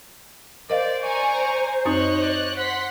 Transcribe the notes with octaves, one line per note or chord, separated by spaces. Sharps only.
A#4 C5 D5 D#5 F5
D5 G#5 A#5 C#6
F#2 C4 D#4 C#5 D#5 C#6 F#6
D5
F#5 C6 F#6 B6